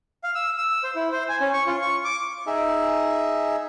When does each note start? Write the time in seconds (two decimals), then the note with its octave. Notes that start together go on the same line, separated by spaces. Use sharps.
0.24 F5
0.35 E6
0.58 E6
0.83 C5
0.95 E4
1.12 C5
1.29 G#5
1.41 C#4
1.53 C#6
1.67 F4
1.82 C#6
2.05 D6
2.47 D#4 G#4 E5